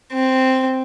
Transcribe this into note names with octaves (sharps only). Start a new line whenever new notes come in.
C4